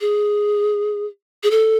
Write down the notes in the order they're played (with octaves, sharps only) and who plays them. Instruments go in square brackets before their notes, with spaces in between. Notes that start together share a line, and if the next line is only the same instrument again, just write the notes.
[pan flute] G#4
G#4
A4